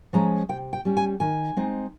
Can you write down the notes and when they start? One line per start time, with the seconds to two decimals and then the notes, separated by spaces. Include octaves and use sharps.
0.13 F3 G#3 C#4 A#5
0.49 C3 G5
0.73 G5
0.85 G3 C#4
0.97 G#5
1.20 D#3 G#5
1.57 G#3 C4 D#4